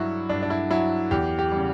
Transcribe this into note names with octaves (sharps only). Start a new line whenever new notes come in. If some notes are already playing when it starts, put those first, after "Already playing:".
Already playing: G2 F#3 E4 F#4
G2 D4
D4
E4
F#3 E4
E2 G4
G4
C#3 G3